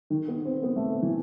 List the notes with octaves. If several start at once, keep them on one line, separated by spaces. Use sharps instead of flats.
D#3
B3
C4
B3
A3
E3